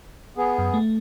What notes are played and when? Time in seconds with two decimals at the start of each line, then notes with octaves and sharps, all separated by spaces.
0.37 B3 G#4
0.58 F#2
0.74 A3